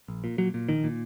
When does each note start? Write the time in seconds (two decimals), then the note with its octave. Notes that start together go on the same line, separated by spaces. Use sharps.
0.08 A#1
0.24 A#2
0.38 A#2 F#3
0.54 A#2
0.69 A#1 D#3
0.84 A#2